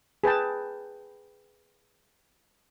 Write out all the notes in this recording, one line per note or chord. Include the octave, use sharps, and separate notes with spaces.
G#4 B4 G5 A5